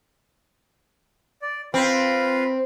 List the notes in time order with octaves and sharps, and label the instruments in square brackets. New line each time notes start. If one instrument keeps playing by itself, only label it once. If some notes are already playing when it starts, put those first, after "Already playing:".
[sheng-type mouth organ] D5
[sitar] C4 [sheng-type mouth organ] F4 B4 F5